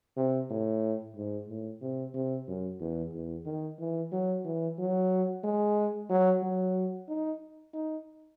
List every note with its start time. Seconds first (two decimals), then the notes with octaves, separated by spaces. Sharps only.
0.17 C3
0.50 A2
1.16 G#2
1.49 A2
1.82 C3
2.14 C3
2.48 F#2
2.80 E2
3.13 E2
3.46 D#3
3.79 E3
4.12 F#3
4.45 E3
4.78 F#3
5.44 G#3
6.10 F#3
6.43 F#3
7.09 D#4
7.74 D#4